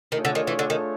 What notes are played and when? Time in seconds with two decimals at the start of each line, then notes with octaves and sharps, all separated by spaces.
0.12 D#3 A3 D4 F4 G#4 C#5
0.25 D3
0.35 D#3
0.47 E3
0.59 D3
0.70 D#3